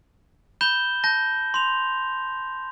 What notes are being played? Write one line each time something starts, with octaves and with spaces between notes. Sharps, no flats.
B5 G6 E7 G7
A5 G6 A#6
C6 F7